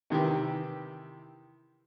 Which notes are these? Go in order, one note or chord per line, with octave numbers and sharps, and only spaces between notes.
C3 D#3 E3 G4